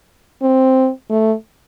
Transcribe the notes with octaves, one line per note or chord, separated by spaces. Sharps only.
C4
A3